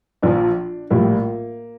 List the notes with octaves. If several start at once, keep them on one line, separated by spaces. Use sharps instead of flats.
A#1 A#2 F3 D4
A#1 A2 G3 A#3